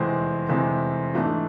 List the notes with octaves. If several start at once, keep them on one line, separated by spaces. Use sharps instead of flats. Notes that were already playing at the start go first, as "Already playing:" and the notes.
Already playing: F1 E2 C3 G#3 C4
F1 E2 C3 G#3 C4
G#2 E3 A3 D4